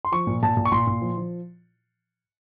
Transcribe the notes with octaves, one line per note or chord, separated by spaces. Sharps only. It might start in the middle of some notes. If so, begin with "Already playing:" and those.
C6
F3 C#6
A#2
A#2 A5
A#2
C#6
A#2 C6
A#2
F3
F3